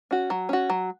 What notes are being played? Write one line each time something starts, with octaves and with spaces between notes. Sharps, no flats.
C#4 F#4
F#3
C#4 F#4
F#3